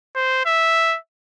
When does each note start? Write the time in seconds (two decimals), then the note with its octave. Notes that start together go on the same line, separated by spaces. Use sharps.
0.16 C5
0.46 E5